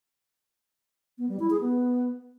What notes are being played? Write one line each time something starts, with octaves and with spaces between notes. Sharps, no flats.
B3
G3
E4
G#4
B3